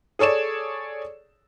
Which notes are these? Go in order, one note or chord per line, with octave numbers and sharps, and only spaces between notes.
G#4 A4 C#5 D5 E7